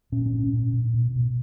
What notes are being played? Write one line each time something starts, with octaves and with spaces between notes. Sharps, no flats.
A#2 C#4
C#4
A#2
C#4
A#2
A#2
B2
B2